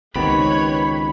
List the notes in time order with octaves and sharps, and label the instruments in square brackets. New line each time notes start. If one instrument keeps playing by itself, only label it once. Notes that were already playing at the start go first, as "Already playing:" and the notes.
[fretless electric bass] C#2 D#3 [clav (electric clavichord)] B3 C4 G4 [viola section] B4 C#5 [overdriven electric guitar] B5